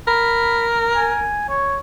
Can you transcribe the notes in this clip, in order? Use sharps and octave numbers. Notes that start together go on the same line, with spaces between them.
A#4 B5
G#5
C#5